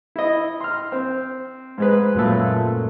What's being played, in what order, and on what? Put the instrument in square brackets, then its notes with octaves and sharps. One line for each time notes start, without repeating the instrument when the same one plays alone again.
[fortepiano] E4 D#5
C6 F6
C4
G#2 G#3 B4
[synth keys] F#2 A#2 A3